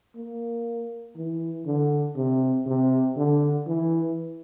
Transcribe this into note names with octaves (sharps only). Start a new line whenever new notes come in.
A#3
E3
D3
C3
C3
D3
E3